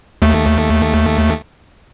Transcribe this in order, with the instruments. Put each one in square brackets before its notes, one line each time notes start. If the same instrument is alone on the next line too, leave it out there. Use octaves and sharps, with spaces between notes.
[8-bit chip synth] D#2 A3